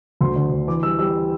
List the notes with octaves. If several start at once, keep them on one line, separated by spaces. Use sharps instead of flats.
D2 C6
D3
D3
E3 D6
G3 E6
G3 E6